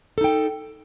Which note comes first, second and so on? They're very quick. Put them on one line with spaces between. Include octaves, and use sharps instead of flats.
A4 D#4 G5